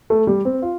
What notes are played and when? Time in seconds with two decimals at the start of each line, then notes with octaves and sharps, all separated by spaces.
0.10 A3
0.27 G3
0.45 C4
0.62 F4